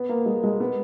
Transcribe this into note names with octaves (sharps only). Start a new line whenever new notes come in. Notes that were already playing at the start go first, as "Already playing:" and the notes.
Already playing: B3
A#3
G#3
G#3
B3